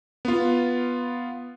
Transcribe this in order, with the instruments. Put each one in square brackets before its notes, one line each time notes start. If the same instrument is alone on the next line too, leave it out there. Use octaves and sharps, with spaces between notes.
[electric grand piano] B3 F4